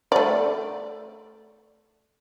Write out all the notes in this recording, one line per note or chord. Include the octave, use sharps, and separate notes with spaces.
A3 D5